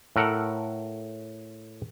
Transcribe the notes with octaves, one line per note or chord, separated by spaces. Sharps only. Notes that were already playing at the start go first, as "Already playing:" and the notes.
A2 A4 A#4 F#5